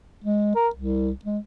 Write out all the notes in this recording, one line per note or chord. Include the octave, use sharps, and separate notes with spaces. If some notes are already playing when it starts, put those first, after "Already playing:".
G#3
A#4
C2
G#3